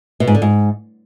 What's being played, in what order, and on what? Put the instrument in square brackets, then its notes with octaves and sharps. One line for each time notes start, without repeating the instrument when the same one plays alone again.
[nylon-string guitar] B2
G#2
D3
G#2